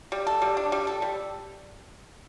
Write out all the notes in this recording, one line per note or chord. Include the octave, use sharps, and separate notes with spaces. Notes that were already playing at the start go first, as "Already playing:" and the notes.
G3
A4
G3
D4
G3
A4
G3